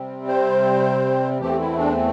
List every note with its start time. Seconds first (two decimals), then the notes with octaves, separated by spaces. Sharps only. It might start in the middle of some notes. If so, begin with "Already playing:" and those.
Already playing: C3 G3 C4
0.28 C5
1.40 E2 E3 A3 C4 G4
1.60 E4
1.78 D4